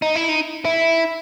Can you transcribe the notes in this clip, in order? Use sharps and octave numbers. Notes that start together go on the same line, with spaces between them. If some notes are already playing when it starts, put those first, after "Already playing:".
D#4
E4
D#4
E4